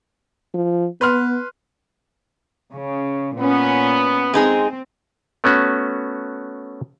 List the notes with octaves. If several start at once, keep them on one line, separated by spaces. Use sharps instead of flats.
F3
B3 B4 C6 F6
C#3
A#2 B3 C#4
G#3 C4 D#4 G#4
A3 B3 C#4 F#4